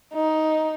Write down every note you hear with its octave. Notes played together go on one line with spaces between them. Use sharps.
D#4